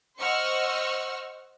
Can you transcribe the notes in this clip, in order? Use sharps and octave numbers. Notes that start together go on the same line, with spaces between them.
C5 D#5 F#5 C#6 E6 F6